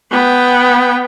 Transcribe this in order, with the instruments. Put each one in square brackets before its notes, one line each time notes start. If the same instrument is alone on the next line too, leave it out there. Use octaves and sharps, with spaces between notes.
[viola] B3 G5